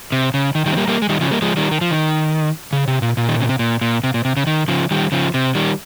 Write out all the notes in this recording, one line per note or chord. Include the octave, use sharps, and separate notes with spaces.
C3
C#3
D#3
D#3 G3
C4
G3 A#3
G3 A#3
G#3
D#3 G3
C#3 F3
G3 A#3
F3 G#3
D#3 G3
D#3
F3
D#3
C#3
C3
A#2
A#2
D#3
C#3
C3
A#2
A#2
C3
A#2
C3
C#3
D#3
C#3 F3
D#3 G3
C#3 F3
C3
D#3 G3